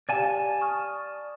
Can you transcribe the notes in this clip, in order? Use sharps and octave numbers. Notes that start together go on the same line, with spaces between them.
G4 D5 F5 G#5 A5
C#6 D#6 F6